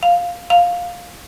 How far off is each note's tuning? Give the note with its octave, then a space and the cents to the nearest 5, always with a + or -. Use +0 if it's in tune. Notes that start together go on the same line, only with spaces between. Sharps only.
F5 +5
F5 +10